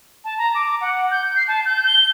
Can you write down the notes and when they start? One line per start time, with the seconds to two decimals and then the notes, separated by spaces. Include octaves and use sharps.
0.24 A5
0.38 A#5
0.55 D6
0.81 F#5
1.11 G6
1.36 C7
1.48 A5
1.65 G6
1.87 G7